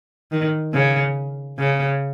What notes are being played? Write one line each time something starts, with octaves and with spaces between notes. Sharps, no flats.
D#3
C#3
C#3